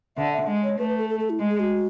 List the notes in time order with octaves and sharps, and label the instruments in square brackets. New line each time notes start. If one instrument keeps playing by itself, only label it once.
[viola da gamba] D3 [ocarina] E5
[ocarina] E5
[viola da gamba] G#3
[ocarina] C#5
[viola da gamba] A3 [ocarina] B4
[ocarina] B4
A4
A4
A4
E4
[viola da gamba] G#3
[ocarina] G#4
F#4